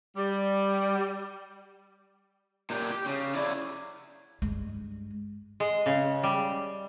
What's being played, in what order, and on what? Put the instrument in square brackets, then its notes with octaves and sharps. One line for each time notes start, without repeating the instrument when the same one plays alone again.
[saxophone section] G3
[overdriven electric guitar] A#2 G4
G4
C#3
E4 D5
[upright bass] G2 G#3
[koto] G#3
C#3
G3